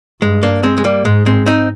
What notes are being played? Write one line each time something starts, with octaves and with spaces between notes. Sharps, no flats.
G2 G#3
A#3 D4
G#3 C4
G#3
G3 A#3
G#2 G#3
G#3 C4
C4 D#4